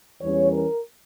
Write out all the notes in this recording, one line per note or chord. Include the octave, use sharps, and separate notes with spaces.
E2 E3 G3 C#4 C#5
A#4